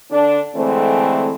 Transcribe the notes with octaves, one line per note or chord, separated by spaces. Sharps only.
D3 D4
D3 E3 G#3 A3 C4